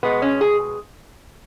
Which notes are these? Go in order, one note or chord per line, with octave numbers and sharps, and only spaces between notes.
B2 G#3 B3
C#4
G#4